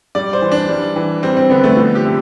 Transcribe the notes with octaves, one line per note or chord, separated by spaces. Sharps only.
G3 D5
C5
E3
D4
G3
E3
G3 C4
C4
D3 B3
A3
F3
G4
C3